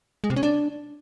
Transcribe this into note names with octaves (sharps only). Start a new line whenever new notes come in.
G#3
C3
C#4
D4